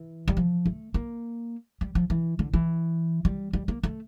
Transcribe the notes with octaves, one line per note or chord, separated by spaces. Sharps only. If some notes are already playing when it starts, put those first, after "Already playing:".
Already playing: E3
G3
F3
A3
A#3
G3
F3
E3
D3
E3
G3
G3
A#3
A3